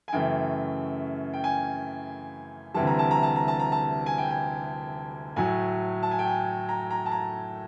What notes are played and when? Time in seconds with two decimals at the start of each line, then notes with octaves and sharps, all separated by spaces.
0.08 G#5
0.13 F#2 C#3 E3 A3 G5
1.33 G5
1.44 G#5
2.74 D2 C3 E3 G3 A5
2.87 A#5
2.99 A5
3.11 A#5
3.23 A5
3.36 A#5
3.48 A5
3.59 A#5
3.72 A5
4.06 G#5
4.18 G5
4.31 G#5
5.36 A2 F#3 A3 G#5
6.03 A5
6.11 G#5
6.19 G5
6.27 G#5
6.69 A#5
6.90 A#5
7.06 A5
7.11 A#5